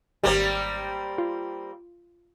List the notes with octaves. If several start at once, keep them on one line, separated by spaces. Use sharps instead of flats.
G#1 G3 A#3 C4 G4
F4